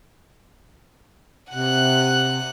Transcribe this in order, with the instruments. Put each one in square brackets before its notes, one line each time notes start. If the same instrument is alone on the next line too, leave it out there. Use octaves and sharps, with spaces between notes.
[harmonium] C3 [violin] F#5 F#6